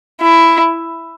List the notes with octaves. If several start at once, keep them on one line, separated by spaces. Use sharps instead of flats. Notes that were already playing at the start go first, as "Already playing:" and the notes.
E4